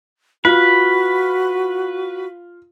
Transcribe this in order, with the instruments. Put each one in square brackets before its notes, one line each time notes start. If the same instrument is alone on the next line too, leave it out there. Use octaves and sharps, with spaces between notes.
[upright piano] F4 [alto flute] F#4 [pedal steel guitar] B4